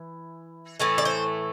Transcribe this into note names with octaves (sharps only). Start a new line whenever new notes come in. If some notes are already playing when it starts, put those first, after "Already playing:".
Already playing: E3
A2 E3 A3
D5
C5